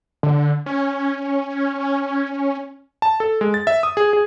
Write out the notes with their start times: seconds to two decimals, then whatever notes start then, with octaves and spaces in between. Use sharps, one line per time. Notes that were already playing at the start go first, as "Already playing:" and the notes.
0.23 D3
0.66 C#4
3.02 A5
3.20 A4
3.41 G#3
3.54 A6
3.67 E5
3.83 D#6
3.97 G#4
4.13 G#4